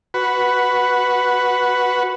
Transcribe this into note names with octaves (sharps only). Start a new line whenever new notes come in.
F#4 B4